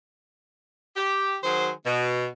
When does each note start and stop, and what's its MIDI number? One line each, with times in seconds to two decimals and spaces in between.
0.97 1.36 67
1.43 1.70 51
1.43 1.70 54
1.43 1.70 68
1.43 1.70 72
1.85 2.26 47